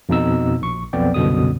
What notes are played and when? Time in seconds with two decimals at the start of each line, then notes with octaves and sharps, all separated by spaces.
0.09 F2 B2 D#4 E6
0.61 A#1 C#6
0.93 B1 F2 B3 D5 G5
1.14 C2 F#2 B2 D3 D#6